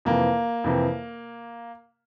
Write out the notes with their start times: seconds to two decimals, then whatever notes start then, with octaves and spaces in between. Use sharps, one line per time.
0.05 F2 C3 E3 A#3
0.64 F2 C3 E3